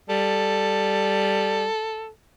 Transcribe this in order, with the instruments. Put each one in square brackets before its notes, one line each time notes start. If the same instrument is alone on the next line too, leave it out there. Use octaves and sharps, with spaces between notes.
[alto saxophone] G3 [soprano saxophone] A4